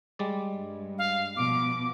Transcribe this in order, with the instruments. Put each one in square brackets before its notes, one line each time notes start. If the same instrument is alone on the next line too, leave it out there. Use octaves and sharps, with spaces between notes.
[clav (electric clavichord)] G3 G#3 D5
[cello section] G2
[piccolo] F5
[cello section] B2 F3 [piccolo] D6